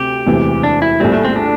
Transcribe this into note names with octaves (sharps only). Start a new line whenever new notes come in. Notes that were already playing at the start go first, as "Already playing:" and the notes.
Already playing: D2 C3 C4 G4
E1 D2 C3 E3
D4
E4
A#1 A2 G3 C4
A3
C4
D4